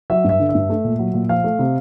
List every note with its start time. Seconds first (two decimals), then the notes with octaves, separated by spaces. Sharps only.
0.10 F#3 E5
0.24 G2 E5
0.40 D3
0.49 E5
0.55 G2
0.69 A3
0.84 A#2
0.99 F#3
1.14 A#2
1.29 F3 F5
1.44 A3
1.59 C3